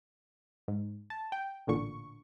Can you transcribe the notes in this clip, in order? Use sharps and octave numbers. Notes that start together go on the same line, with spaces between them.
G#2
A5
G5
A1 A#2 D3 C#6